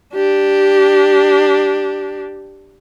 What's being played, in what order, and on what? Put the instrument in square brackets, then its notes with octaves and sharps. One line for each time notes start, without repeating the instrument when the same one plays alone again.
[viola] D4 G4